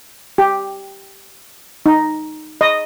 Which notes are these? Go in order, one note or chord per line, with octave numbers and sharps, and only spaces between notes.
G4
D#4
D#5